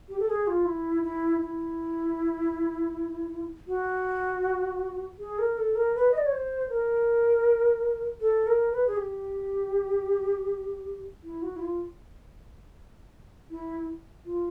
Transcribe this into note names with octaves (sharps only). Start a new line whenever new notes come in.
G4
A4
G#4
F4
E4
E4
E4
F#4
G#4
A#4
A4
A#4
B4
D#5
D5
C#5
C5
A#4
A4
A#4
B4
G#4
G4
E4
F#4
E4
F4
E4
F4